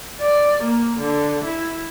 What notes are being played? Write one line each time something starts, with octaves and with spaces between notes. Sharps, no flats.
D5
A#3
D3
E4